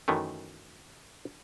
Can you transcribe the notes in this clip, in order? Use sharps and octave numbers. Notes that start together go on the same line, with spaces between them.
F#2 D#3 E3 A3